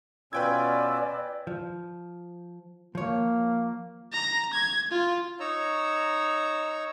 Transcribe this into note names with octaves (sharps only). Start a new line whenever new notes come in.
B2 C#4 F4 B4 D5 G5 E6 G#6
F3
F3 A#3 C#5
A#5
G#6
F4
D#4 C#5 A#5 E6